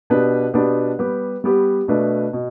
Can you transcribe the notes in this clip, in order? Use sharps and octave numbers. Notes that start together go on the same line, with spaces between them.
B2 B3 D4 G4 B4
B2 B3 D4 G4 B4
G3 B3 G4 B4
G3 B3 G4 B4
B2 A3 D4 B4
B2